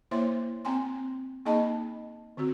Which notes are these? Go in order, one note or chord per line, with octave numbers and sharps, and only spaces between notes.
A#3 E4 C5 C#5 E5 C6
C4 G5 G#5 C6
A#3 D#4 G#4 D#5 A5 B5
D3 C4 F#4